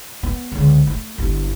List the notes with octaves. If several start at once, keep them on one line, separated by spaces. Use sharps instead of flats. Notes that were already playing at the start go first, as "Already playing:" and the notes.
B3
C#2 D3
A3
G1 E4